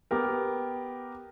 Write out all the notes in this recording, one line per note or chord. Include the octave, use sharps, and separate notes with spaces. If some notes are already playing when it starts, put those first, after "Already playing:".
B3 G4 A#4